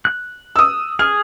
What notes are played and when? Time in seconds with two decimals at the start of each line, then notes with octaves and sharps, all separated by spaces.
0.05 F#6
0.56 D#6 E6
0.99 G#4 F6